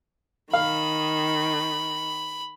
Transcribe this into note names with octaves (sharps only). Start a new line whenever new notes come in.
D#3 F5 B5